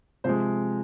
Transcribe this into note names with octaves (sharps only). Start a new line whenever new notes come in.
C3 F3 G#3 C5